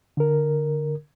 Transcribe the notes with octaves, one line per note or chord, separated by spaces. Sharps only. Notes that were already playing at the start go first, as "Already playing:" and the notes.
D3 A#4